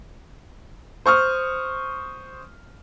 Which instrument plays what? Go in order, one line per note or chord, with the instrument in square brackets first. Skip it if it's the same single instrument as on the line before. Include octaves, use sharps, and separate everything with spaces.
[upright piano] C5 C#6 D#6 F6